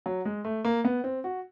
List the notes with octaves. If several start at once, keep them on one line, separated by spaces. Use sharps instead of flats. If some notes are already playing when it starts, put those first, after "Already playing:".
F#3
G#3
A3
A#3
B3
C4
F#4